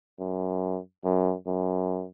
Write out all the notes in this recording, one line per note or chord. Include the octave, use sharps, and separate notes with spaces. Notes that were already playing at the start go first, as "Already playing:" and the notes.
F#2
F#2
F#2